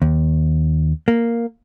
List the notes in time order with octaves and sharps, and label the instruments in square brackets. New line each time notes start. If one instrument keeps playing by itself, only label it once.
[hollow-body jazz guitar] D#2
A#3